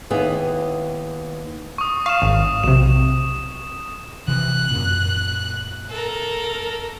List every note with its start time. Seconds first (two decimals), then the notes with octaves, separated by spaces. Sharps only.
0.10 D#2 B3 E4 G#4
1.78 C#6 D#6
2.06 F5 C#6 E7
2.22 G#1
2.64 B1 C3 E7
4.28 C3 E3 F#6
4.71 F#2 A#2
5.89 A4 A#4